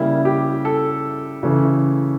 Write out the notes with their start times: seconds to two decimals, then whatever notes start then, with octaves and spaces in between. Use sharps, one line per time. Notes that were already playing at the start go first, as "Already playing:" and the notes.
Already playing: C#3 G3 A#3 E4
0.25 G4
0.65 A4
1.43 C#3 E3 A3